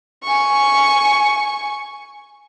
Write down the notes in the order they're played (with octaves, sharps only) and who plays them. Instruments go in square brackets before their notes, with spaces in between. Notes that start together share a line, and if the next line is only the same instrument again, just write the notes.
[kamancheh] G#5 C#6